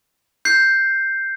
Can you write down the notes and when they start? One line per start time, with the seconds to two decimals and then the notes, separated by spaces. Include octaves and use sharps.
0.45 G6 C7